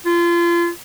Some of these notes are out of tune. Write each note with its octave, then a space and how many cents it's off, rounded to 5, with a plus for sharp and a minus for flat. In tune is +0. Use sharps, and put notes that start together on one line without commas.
F4 -30